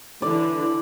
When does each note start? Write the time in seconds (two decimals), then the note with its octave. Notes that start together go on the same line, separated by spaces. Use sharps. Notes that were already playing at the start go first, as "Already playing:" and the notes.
0.22 D3 E3 D5